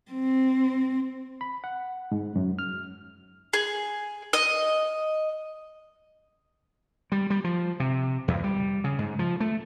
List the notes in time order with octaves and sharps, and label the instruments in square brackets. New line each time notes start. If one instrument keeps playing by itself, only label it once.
[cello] C4
[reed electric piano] B5
F#5
G#2
F#2
F6
[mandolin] G#4
D#5
[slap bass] G3
G3
F3
C3
E2
G3
C#3
G#2
F3
A3